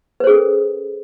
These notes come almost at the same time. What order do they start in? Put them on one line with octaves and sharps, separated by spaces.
B4 C5 G#4 C#4 A4